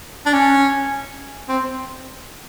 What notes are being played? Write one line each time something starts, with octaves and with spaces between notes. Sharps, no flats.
D4
C#4
C4